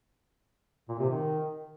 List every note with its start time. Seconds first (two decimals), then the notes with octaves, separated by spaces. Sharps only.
0.89 A#2
0.99 C3
1.09 D#3